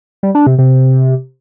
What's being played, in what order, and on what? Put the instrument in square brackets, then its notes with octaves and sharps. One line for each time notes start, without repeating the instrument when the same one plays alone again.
[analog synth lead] G3
D4
C3
C3